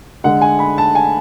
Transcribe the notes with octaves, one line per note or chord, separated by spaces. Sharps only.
D3 G#3 F#5
G#5
B5
A5
G#5